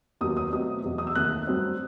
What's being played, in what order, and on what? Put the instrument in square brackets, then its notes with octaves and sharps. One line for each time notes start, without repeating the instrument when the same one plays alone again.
[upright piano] D#2 D#3 F#3 B3 D#6
D#6
B2 F#3 A3 C4 D#6
E2 B2 F#3 A3
D#6
E6
D#2 D#3 A3 F#6
G2 F#3 C4